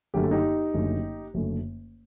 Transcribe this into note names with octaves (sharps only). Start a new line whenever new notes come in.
F#1 F#2 D3 A3 G4
A4
D#4 G4
F#1 F#2 D3 A3
F#1 F#2 D3 A3